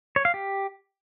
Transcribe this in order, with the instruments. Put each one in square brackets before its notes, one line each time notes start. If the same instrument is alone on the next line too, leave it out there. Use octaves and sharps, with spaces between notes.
[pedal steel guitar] C#5
F5
G4